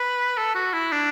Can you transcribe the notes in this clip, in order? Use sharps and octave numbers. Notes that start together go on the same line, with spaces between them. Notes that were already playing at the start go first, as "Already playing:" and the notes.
Already playing: B4
A4
F#4
E4
D4